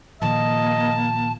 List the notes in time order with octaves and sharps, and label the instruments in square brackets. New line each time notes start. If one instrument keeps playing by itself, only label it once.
[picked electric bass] A#2 D#3 F3 [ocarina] A#3 [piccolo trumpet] D#5 [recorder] A5